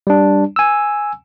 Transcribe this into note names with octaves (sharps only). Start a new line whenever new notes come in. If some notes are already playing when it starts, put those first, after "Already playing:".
G3 D4
G#5 E6